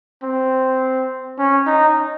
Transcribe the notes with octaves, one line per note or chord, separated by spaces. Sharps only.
C4
C#4
D#4